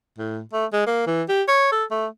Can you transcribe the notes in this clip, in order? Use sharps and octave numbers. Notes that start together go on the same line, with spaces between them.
A2
A3
G#3
A#3
E3
G4
C#5
A4
A3